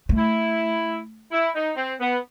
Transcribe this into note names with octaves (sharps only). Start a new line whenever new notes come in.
A3
E4
E4
D#4
C4
B3